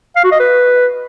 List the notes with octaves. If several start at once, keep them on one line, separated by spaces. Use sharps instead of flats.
F5
F#4
D#5
B4